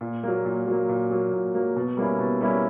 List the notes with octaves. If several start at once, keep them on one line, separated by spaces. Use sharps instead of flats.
A#2
F#3 A#3
A#2
F#3 A#3
A#2
F#3 A#3
A#2
F#3 A#3
B2
G3 A#3 C#4 E4
B2
G3 A#3 C#4 E4